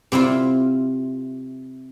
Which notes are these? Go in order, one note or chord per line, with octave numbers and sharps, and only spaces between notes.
C3 C4 E4 F4